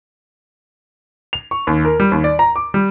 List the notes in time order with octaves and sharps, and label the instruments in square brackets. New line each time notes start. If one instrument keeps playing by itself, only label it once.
[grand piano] F7
C#6
D#2
A#4
G3
D#2
D5
A#5
D6
G3